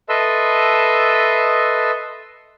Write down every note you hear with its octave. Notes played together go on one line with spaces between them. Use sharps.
A4 B4 D#5 E5 C6 E6